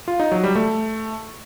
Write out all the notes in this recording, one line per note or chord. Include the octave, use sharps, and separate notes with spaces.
F4
D#4
F#3
G3
A3